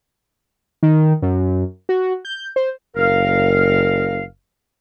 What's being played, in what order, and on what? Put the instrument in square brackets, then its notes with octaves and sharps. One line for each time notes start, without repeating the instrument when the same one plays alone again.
[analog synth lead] D#3
F#2
F#4
G6
C5
[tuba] F#1 [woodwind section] A#4 F5